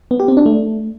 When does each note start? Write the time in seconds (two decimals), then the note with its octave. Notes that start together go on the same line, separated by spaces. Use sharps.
0.11 B3
0.20 G4
0.28 C4
0.37 D4
0.46 A3